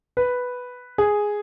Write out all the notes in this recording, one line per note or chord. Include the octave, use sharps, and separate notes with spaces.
B4
G#4